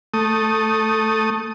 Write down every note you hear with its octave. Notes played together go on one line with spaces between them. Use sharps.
A3 D#6